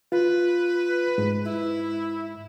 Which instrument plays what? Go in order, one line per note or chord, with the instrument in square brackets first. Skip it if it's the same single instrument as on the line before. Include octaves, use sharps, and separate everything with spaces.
[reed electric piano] F4 [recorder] B4
[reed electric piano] G#2
[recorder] E4